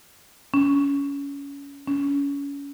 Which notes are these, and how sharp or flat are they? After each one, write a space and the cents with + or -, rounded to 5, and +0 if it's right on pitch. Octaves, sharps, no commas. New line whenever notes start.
C#4 +25
C#4 +30